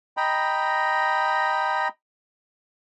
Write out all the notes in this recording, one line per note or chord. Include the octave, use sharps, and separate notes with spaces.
D#5 G5 A#5 B5